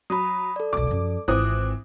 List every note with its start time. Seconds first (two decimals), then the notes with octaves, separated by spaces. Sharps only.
0.10 F#3 B5 D#6
0.56 A4 D5
0.73 E1 B1 D6
0.87 F#2 F3
1.28 G#1 E3 C4 F4 D6 D#6 F#6